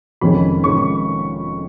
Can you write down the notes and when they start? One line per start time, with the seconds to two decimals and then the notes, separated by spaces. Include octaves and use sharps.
0.21 F1 F2 D#3 G#3 C#4 B5
0.64 F1 F2 D#3 G#3 C#4 C#6